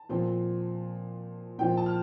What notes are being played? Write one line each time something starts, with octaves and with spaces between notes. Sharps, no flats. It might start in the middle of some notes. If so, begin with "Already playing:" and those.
Already playing: A5
A#2 F3 C4
A#2 F3 C4 G5
A5
F6